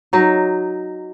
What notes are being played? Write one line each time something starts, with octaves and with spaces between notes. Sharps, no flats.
F#3 D#4